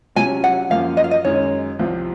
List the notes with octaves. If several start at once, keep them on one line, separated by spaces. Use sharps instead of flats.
C3 F#3 C#4 F4 G#5
F#5
F#2 F3 A#3 F5
D#5
F5
D#5
F#2 D#3 G#3 D#4 C#5
C2 C3 F3 C4